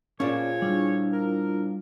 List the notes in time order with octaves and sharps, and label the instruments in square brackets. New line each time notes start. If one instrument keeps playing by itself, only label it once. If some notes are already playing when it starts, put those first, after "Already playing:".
[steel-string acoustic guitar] A#2 F3 [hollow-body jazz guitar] C#4 D5 [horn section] G#4 C#5
[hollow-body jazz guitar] G3 [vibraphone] D4 E4 F4
[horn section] A#4